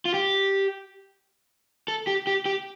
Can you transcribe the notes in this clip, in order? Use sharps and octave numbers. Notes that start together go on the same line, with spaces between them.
F4
G4
A4
G4
G4
G4